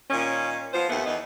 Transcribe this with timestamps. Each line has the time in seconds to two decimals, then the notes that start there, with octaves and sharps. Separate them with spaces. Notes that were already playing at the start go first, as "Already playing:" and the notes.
0.10 A#2 D#3 C#4
0.74 F3 B3 F4 C5
0.90 D#2 A3 B3
1.06 E2 B3 D#4